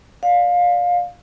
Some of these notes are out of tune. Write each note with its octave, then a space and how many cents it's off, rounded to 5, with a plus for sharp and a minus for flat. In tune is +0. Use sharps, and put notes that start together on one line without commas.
D5 +0 F5 +20